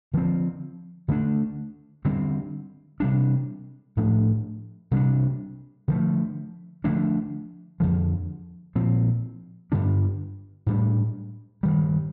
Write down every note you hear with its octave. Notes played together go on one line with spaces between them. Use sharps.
D3 F3 C4
D3 A3 D4
D3 G3 C4
C3 G3 D4
A2 F3 A3 D4
C3 G3 A#3 D4
D3 F3 A3
D3 F3 A3 D4
F2 D3 F3
A#2 F3 C4
G2 D3 G3 D4
A2 G3 D4
G2 D#3 G3